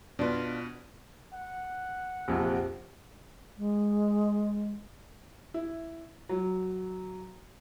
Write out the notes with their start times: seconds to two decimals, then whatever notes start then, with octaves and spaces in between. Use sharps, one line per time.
0.19 B2 D4 F4 B4
1.33 F#5
2.28 A#1 F2 C3
3.58 G#3
5.54 E4
6.29 F#3